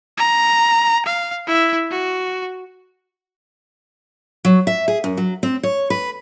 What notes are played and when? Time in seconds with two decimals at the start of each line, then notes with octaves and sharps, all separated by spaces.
0.17 A#5
1.06 F5
1.47 E4 E5
1.91 F#4
4.45 F#3
4.67 E5
4.88 G#4
5.04 F#2
5.17 F#3
5.43 C4
5.63 C#5
5.90 B4